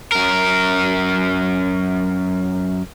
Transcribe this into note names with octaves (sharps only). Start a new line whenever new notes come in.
F#2 A#4